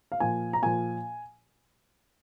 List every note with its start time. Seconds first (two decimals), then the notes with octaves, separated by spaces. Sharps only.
0.12 F5
0.20 A#2 F3 G#5
0.53 A#5
0.62 A#2 F3 G#5